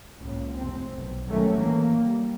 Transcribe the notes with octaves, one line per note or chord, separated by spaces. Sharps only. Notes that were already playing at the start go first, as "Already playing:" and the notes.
C#2 A#2
F1 C2 C4
B1
D#3 F#3 G3 A3 C#4
E3 A#3
G3